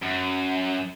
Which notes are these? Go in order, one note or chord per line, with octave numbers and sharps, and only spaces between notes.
F#2